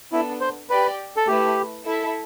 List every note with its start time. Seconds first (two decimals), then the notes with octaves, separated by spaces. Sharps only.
0.12 B3 D4 E4 A4
0.41 C5
0.69 G4 B4 D5 G5
1.17 A4
1.28 A3 E4 G4 B4
1.85 E4 A4 E5